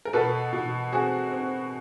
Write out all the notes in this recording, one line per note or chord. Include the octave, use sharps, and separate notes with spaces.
A#4
B2 A4 B4
B2
C4 F#4 G#4
C4